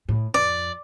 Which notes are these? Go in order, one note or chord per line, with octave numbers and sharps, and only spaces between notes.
A2
F2 D5